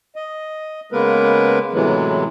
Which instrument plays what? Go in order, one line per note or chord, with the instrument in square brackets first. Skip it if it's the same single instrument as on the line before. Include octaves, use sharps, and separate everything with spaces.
[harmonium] D#5
C#3 G#3 A#3 B3 A#4 B4
A2 C3 E3 F#3 G#3 B3